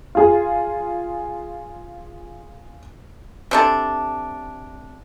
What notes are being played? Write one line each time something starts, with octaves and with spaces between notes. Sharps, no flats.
F4 G#4
C3 D4 A4